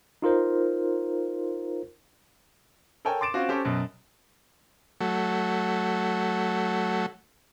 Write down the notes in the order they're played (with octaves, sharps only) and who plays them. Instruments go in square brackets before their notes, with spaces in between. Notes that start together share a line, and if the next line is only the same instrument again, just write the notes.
[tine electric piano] D#4 F4 A#4 C5
[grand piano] A4 A#4 C#5 G5 G#5
C6 D6 A6 D7 E7
C4 C#4 F4 F#4
C#4 G4 A4 C5
F#2 B2 F#3
[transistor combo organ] F#3 A3